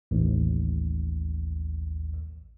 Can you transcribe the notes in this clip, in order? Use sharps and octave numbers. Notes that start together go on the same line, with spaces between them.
A1 D#2